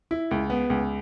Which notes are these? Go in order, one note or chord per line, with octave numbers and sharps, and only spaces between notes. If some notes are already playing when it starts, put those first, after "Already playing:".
E4
C#2
B3
C#2